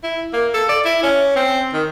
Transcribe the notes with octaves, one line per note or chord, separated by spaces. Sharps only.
E4
A#3
A4
D5
E4
C#4
C4
D#3